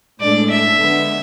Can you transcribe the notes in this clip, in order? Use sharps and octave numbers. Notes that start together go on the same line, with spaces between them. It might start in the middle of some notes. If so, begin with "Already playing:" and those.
A2 G#3 D4 A4 D5
E5
D3 G#3 B3